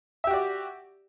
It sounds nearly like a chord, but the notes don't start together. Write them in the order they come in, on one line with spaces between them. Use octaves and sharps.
E5 G4 F#4 D5